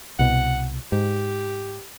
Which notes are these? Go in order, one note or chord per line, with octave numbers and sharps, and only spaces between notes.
C2 B2 F#5
G#2 G4